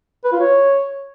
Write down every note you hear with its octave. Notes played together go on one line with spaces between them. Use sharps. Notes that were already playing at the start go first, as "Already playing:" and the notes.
B4
F4
C#5